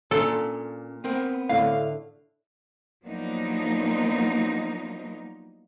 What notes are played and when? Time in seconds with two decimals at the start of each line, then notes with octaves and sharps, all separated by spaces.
0.11 A#2 A#3 C#4 D4 A4
1.04 B3 C4 A#4
1.49 A2 D3 A3 F5
3.05 F3 F#3 A#3 B3 D4 D#4